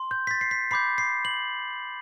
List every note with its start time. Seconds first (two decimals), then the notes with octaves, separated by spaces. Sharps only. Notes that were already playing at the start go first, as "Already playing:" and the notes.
Already playing: C6
0.11 G6
0.27 B6
0.31 A6
0.41 C7
0.51 B6
0.71 B5 D6 G6 C7
0.98 C7
1.25 F#7